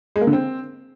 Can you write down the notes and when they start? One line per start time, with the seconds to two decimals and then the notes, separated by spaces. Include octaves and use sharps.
0.16 G#3
0.21 A#3
0.27 D3
0.33 C4